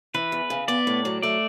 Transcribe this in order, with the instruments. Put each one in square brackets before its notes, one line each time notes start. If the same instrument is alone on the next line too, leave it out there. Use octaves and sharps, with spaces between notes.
[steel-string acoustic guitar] E3 [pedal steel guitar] B4
[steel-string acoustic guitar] E2
C#3
[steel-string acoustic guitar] B3 [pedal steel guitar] D5
[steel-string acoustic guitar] A2
F#3
[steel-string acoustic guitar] A3 [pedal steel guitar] D5